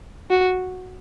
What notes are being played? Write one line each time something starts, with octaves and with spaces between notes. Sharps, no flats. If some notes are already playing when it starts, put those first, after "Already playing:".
F#4